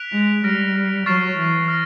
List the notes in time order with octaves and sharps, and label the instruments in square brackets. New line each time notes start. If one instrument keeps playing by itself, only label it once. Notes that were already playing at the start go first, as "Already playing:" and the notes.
Already playing: [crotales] F#6 B6 D7 F7
[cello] G#3
[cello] G3 [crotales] F6 A#6 D7
[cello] F#3 [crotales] C#6 F6 A6 C7 E7
[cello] E3
[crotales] F6 A#6